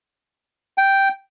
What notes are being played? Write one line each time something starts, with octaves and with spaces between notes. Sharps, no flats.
G5